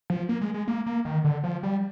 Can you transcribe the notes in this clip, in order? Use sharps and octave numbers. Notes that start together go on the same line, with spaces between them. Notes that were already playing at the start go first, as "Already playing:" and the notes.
F3
A#3
G#3
G#3
A#3
A#3
D#3
D3
F3
G3